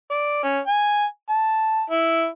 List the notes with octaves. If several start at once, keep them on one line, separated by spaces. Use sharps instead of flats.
D5
C#4
G#5
A5
E4